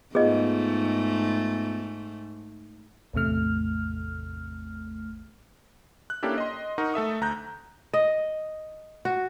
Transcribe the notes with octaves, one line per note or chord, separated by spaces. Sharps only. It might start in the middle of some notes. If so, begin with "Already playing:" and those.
G#2 A3 B3 F4 G#4 D#5
A1 E2 C3 A3 F6
F#6
A#3 C#4 D4 E4 G4 A4
D#5 C6
D#4 A#4 F#5 C#6
A3 A4 E5 D#6
D2 A#5 F#6 G6
D#5
F#4